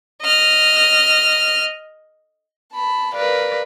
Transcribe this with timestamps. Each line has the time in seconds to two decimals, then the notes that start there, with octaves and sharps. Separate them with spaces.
0.23 D#5 F6
2.73 A5 B5
3.15 A#4 B4 D5 F5